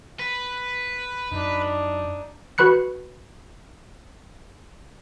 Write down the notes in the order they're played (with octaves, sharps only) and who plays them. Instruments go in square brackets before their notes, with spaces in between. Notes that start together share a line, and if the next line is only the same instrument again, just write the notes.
[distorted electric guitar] B4
[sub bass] F#2 [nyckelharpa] D4 D#4
[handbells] F#4 B4 B5 F#6 C#7